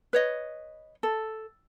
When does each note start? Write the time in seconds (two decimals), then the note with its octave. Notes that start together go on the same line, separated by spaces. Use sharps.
0.13 B4 C#5 D#5
1.03 A4